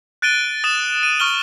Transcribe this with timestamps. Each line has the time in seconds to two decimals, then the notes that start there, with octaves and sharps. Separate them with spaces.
0.22 F#6 A6 D7 D#7 G7
0.64 D#6 A6 E7
1.03 D#7
1.20 C#6 F6 G7